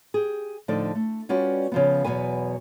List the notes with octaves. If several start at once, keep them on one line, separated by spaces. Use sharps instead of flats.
G4 G#4
A2 D3 F3 D#4 A4 D5
A3
G3 C#4 F4 F#4 B4 D5
C#3 F3 B3
E2 G#2 B2 F#3 B4 G#5